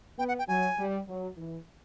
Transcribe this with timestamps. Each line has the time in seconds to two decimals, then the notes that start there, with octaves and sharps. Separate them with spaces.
0.18 B3 G5
0.28 F#5
0.39 G5
0.48 F#3 G#5
0.78 G3
1.07 F#3
1.37 E3